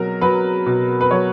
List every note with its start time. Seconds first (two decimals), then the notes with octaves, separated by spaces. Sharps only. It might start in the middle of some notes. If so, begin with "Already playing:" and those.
Already playing: B2 F#3 A#4
0.21 F#3 B4
0.66 B2
1.01 B4
1.11 F#3 C#5